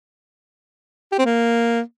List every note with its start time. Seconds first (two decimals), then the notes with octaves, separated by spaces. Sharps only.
1.12 G4
1.19 C4
1.25 A#3